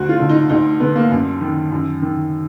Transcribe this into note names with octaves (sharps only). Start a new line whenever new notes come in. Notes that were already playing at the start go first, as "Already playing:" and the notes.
Already playing: D2 F#4
F4
D3
D#4
D2 D#4
D3 B3
A#3
F#2
D#3
F#2
D#3